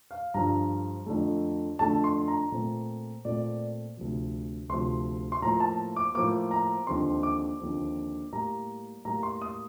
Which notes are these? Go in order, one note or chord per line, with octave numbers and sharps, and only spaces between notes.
F5
G2 D3 F3 A#5
F2 D3 A3
F2 D3 A3 A5
C6
A#5
A#2 A3 C4
A#2 A3 C4 D5
D2 C3 F3
D2 C3 F3 C6
C6
A2 F3 A#3 A#5
A5
D6
A2 F3 A#3 D6
A#5
D#2 D3 F3 C4 C6
D6
D#2 D3 F3 C4
A2 G3 A#3 A#5
A2 G3 A#3 A#5
C6
D#6